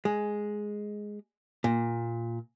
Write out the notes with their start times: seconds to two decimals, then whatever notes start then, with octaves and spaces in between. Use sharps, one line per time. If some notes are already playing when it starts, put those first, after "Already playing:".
0.05 G#3
1.64 A#2